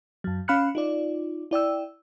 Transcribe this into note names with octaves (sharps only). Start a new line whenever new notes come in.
F#2 F#3
C#4 F5 B5 F6 F#6 C#7
D#4 F4 D5
E4 D5 G5 E6